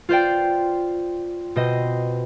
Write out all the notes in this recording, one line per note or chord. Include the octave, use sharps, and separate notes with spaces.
F4 C5 D5 G5
B2 C4 C5 D#5